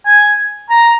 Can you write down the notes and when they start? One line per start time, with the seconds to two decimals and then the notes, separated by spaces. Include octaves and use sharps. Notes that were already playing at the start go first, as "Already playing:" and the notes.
0.05 G#5
0.70 A#5